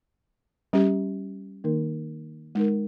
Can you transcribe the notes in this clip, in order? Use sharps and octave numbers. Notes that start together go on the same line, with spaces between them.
G3 C#4 G4
D#3 A#3 D#4 A#4
G#3 D#4 A#4